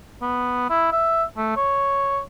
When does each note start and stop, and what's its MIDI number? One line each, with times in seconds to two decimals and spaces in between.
0.22 0.69 59
0.70 0.88 64
0.92 1.24 76
1.37 1.55 57
1.56 2.20 73